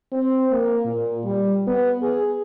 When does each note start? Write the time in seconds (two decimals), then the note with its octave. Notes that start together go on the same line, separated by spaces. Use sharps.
0.12 C4
0.51 A#3
0.86 A#2
1.24 G3
1.67 B3
2.03 G#4